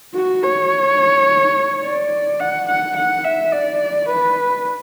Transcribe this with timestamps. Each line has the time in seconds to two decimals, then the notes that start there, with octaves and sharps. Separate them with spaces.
0.15 F#4
0.43 C#5
1.83 D5
2.40 F#5
2.68 F#5
2.96 F#5
3.24 E5
3.52 D5
4.08 B4